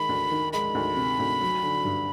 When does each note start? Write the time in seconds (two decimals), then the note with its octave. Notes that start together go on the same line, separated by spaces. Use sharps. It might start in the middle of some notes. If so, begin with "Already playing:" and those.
Already playing: D#3 G#3 B5
0.09 D2
0.31 D#3
0.53 G#3 B5
0.75 D2
0.97 C3
1.19 D2
1.40 F#3
1.63 D3
1.85 G2